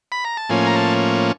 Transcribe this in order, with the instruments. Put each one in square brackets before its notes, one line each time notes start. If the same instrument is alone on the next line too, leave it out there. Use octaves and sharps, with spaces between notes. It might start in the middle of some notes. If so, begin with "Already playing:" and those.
[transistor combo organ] B5
A#5
A5
A2 F3 A#3 C#4 G#5
A#5
A5